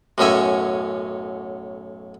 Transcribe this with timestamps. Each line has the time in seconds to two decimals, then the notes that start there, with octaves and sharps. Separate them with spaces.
0.18 B1 F#2 A2 C#4 E5 G#5